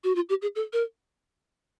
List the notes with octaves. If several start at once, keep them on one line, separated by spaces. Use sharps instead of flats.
F#4
F4
G4
G#4
A4
A#4